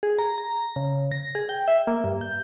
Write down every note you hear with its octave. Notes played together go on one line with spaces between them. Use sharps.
G#4
A#5
A#5
C#3
A#6
G#4
G5
E5
A#3
G2
G6